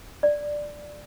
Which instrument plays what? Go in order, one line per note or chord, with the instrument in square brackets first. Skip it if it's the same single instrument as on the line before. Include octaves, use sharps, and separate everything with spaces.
[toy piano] D5